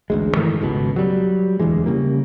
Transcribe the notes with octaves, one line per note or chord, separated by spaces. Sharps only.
A1 D2 G#3
G2 D#3 E3 A3
G#1 C#2 B2
F#3 G3
E1 D2 E3 G#3
C#3 G3 A#3